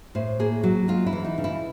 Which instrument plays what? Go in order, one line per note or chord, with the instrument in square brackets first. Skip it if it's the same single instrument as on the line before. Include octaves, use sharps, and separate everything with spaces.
[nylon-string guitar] A2 C5
A#3 G#4
F#3 F#4
G#3 F4
E4
E3
D#4
C#3
E4